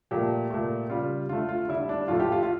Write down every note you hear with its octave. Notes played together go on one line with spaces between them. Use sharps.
A#2 F3 A3 G4
A#2 A3
C#3 G3 F4
D3 A3 F4
F4
D3 G3 E4
D4
A2 F3 A3 F4
G4
F4
F4